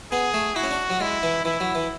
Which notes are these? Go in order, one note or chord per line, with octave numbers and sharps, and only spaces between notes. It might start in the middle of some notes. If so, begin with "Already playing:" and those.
B3 G#4
A3
E4 F#4
C#4
D4
F#3
G#3 E4
E3
E3 E4
F#3
E3